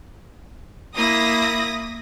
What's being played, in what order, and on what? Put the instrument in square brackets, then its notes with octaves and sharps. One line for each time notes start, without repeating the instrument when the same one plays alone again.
[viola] A#3 E4 [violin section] D#6 A#6